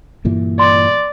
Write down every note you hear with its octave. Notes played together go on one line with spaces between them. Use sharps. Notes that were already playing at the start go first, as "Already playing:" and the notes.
G2 A#2 E3
D5 C6